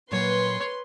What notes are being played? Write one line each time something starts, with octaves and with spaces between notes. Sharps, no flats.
A#2 F#3 B4 C#5 G#5 C6